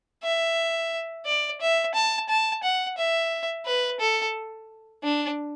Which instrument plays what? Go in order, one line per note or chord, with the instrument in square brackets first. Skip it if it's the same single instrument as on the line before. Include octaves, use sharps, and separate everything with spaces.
[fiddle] E5
D5
E5
A5
A5
F#5
E5
B4
A4
D4